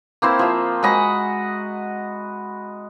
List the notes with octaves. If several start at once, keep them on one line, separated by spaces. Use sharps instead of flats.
A#3 C4 E4 C5
F3 E5
G#3 F#4 D#5 B5